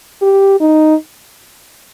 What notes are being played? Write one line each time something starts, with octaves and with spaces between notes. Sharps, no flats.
G4
D#4